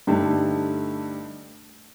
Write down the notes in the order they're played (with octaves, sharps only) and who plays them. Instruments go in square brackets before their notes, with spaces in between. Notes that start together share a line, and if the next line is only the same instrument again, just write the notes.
[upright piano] G2 D3 A3 D#4 G4